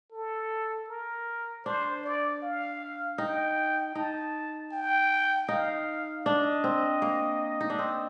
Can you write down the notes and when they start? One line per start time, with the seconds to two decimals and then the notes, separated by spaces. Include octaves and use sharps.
0.12 A4
0.89 A#4
1.65 D4 C5
2.03 D5
2.42 F5
3.18 D#4 G5
3.95 D#4 A5
4.72 G5
5.48 D#4 F5
6.25 D4 D#5
6.64 C4
7.02 A#3
7.61 D#4
7.70 D4
7.79 C4